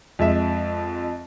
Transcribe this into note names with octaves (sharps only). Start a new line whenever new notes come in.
F2 G#3 E5